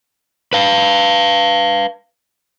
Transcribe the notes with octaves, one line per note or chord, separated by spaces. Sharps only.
B4 F5